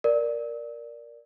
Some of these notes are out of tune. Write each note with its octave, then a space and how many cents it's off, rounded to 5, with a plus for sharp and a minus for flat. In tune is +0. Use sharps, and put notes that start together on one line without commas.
A#4 +10 D5 +0